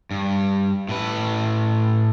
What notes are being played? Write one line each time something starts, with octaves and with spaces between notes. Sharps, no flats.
G2
A2 B4